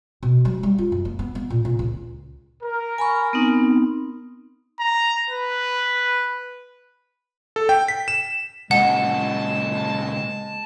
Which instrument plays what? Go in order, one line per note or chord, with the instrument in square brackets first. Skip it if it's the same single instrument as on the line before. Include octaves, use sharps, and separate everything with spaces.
[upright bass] B2
F#3
G3
F4
F#2
A#3
B3
B3
A#2
A#2
C#2
[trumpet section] A#4
[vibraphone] G#5 B5 C#6
B3 C4 D#4
[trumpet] A#5
B4
[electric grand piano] A4
G5
B6
E7
[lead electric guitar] A#2 C#3 [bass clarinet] G#3 [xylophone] F#5 [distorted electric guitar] A5